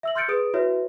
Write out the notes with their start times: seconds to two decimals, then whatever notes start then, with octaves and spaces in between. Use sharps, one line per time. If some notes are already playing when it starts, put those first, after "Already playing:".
0.03 E5 E6 F#7
0.15 C6 F6 G6 A6 C#7 D7
0.28 G#4 B4 D#6 D7
0.54 E4 F#4 B4 C#5 E5